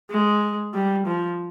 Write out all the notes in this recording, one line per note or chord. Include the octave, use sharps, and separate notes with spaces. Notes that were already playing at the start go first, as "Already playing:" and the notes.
G#3
G3
F3